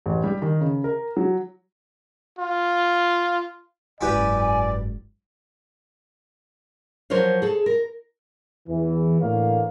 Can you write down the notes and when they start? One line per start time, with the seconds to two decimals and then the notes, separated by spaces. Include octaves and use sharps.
0.06 A1
0.24 G3
0.42 D#3
0.61 C#3
0.84 A#4
1.17 F#3
2.39 F4
4.01 F#1 G#2 E4 G4 B4 D5 G#5
7.10 F3 F#3 A#4 C5 C#5
7.42 G#4 A4
7.66 A#4
8.68 E2 E3
9.21 A2 D3 E3 A#3 C#5 F5